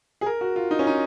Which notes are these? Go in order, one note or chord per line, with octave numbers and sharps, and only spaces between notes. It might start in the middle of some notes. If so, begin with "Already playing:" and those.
G#4
A#4
F#4
F4
D#4
C#4
D#4